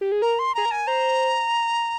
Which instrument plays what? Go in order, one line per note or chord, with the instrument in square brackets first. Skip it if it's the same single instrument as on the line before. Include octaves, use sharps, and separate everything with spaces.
[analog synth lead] G4
G#4
[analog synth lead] A#4 [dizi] A#5
[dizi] C6
[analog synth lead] G#4 [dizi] A#5
[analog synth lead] A#4
[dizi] G#5
[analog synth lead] C5 [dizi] A#5